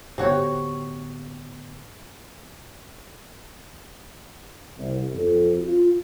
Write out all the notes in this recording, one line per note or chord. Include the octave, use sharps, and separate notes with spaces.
A2 D3 B3 C4 F#4 G4 C#5 F#5
C2
F2
F4